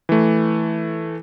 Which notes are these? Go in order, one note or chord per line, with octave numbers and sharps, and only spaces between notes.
E3 A3